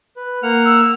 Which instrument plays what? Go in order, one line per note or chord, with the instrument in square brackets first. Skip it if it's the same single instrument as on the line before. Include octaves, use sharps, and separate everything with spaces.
[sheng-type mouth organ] B4
A#3 F#5 F6
[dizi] E6